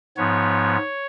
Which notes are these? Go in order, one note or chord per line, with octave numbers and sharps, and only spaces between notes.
G#2 F3 B3 C#5